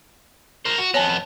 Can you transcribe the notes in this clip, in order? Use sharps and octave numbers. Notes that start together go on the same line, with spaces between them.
A#4 C5
F#4
F2 B3 C#5 G#5 A5